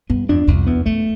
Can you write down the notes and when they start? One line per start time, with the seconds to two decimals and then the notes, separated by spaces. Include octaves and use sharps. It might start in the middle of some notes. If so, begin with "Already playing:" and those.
0.10 G2 B3
0.29 F2 D4
0.47 C2 F2
0.67 E2 B3
0.86 F2 A3